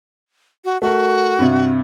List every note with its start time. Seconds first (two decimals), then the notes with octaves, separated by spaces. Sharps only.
0.65 F#4
0.82 A3 F#4 A#4
1.39 G2 C3